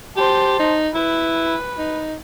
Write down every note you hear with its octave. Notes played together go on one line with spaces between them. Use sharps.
G4 C5 A5
D#4
E4 B4
D#4